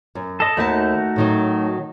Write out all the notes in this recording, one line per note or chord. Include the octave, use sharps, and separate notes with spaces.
F#2
A4 D#5
D#2 A3 D#4 F#4 E5 A5
A2 D#3 F#3